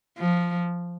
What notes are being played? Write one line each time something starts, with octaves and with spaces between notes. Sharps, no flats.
F3